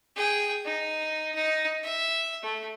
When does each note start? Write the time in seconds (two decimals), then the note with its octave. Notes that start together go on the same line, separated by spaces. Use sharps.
0.16 G#4 G5
0.65 D#4
1.34 D#4
1.83 E5
2.42 A3